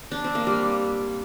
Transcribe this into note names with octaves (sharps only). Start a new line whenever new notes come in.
D4
C4
A#3
G3